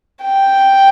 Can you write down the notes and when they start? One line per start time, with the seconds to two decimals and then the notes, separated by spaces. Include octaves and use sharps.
0.24 G5